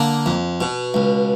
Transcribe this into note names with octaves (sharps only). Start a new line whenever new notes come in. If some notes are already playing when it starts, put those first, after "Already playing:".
Already playing: D3 A#3
F2
B2
C#2